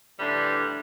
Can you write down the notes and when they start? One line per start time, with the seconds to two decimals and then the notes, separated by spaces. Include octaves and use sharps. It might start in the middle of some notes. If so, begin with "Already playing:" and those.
0.19 A2 D3 E3 G3 D4